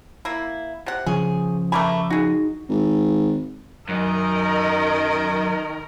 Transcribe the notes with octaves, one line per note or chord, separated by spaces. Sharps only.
A#3 E4
C3 F#5
C#3 F3 C#4 G#4
A3 A#4 G#5 B5 C#6 D6
D#4 F#4 G#4
G#1
F#2 D#3 A#4 D#5